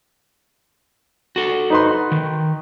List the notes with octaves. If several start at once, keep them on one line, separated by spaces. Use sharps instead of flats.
F#4 A4
D#4 B4 C6
D#3